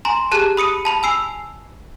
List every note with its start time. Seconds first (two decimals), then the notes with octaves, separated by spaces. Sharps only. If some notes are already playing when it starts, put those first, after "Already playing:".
0.05 G#5 A#5 C6
0.32 G4 G#4 A5 F#6
0.57 B5 D#6 C#7 D#7
0.85 A5 B5 F7
1.03 G#5 E6 C7 F7